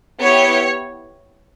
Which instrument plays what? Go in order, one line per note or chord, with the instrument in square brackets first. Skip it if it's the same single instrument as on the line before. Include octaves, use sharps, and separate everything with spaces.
[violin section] B3 E4 G4 C#5